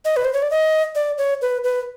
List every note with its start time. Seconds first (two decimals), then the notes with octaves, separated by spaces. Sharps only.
0.05 D#5
0.17 B4
0.25 C5
0.33 C#5
0.42 D5
0.51 D#5
0.95 D5
1.18 C#5
1.42 B4
1.64 B4